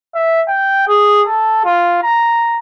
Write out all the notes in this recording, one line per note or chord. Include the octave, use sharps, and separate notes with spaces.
E5
G5
G#4
A4
F4
A#5